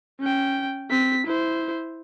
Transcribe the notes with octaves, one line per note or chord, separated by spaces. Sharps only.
C#4 G5
C4 B6
E4 C5